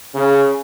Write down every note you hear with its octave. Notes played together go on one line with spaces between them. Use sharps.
C#3